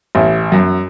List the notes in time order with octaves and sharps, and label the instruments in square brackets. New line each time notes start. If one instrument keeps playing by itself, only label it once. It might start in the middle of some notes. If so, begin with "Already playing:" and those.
[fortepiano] A1
F#2